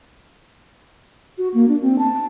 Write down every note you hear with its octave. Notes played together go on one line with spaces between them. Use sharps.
F#4
A#3
D4
C4
A5